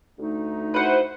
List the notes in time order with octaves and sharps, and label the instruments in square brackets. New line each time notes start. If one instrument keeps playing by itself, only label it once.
[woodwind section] D2 A3 D#4
[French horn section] E4 F#4 C5 [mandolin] B4 F#5